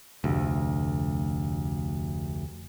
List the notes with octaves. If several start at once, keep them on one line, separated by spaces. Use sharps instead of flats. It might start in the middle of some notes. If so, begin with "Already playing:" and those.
F1 D2